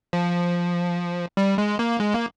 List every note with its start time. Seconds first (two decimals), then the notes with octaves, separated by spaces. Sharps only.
0.13 F3
1.37 G3
1.58 G#3
1.79 A#3
2.00 G#3
2.14 A#3